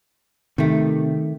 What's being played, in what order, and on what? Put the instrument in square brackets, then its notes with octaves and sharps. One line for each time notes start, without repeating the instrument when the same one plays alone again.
[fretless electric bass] C3 [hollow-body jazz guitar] D#3 A3